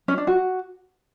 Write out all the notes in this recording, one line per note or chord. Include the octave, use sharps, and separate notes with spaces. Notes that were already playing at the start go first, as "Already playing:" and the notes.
C#4
D4
F#4